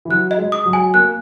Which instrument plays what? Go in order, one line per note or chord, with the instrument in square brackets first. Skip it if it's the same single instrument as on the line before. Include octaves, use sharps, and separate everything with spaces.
[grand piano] E3
[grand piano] F#3 [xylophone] F#6
[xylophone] D#5
[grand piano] G#3
[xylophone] D#6
[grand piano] F#3
[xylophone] G#5
[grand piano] A#3 [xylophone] F#6